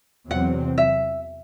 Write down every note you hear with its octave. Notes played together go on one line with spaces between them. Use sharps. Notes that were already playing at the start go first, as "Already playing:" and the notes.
E2 C3 F#3 C4 F#5
E5